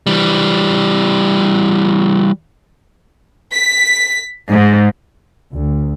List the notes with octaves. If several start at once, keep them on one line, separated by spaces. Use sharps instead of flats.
E3 G3
B6
G#2
D2